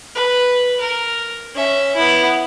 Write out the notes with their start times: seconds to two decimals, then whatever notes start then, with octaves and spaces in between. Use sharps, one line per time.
0.15 B4
0.80 A#4
1.54 C#4 E5
1.95 B3 E4